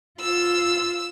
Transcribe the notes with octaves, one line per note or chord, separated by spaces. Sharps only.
F4 E6